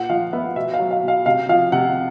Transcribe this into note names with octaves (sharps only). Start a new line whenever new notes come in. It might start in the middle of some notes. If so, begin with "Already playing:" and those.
Already playing: A#2 F#5
F3 F5
B3 E5
B2 E5
F5
F#3
F5
B2
F5
C3 F5
F3 F5
C3 F#5